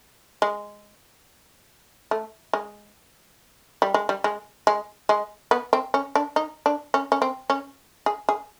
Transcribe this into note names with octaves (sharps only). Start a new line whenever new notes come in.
G#3
A3
G#3
G3
G#3
G3
G#3
G#3
G#3
B3
C4
C#4
D4
D#4
D4
C#4
C#4
C4
C#4
G#4
G#4